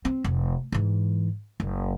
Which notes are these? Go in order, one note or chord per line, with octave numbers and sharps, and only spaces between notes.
C4
F1
G#2 E3
F#1